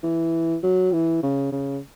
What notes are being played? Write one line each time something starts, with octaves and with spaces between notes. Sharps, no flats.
E3
F#3
E3
C#3
C#3